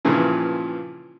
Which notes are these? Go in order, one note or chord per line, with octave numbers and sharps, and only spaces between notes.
G2 A#2 C#3 E3 F3